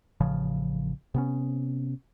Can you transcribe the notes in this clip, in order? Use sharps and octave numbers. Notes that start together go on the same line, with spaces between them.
A1 C#3 F3
C3 B3 C#4